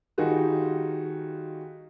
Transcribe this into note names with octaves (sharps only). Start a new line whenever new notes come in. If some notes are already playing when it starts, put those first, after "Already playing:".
D#3 G3 D#4 F4 F#4 G#4